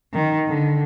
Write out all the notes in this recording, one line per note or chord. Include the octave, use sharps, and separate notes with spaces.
D#3
D3